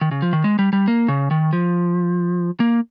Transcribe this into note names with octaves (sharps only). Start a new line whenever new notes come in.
D#3
C#3
F3
D#3
G#3
G3
G3
A#3
C#3
D#3
F3
A#3